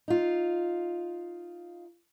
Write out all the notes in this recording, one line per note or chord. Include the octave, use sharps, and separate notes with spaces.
D#4 F4